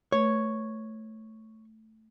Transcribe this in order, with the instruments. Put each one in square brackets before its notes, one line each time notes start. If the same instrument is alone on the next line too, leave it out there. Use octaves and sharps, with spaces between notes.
[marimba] A3 B4 [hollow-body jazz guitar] C#5